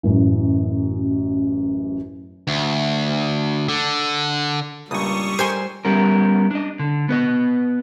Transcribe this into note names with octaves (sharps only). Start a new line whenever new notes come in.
A1 F#2
D2
D3
C#2 G2 A#2 G3 C#6 D#6
G4 A#4 C5 G#5 C6
G3 B3 C#4 A#4
D4 D#5
D3
B3 B4 D#5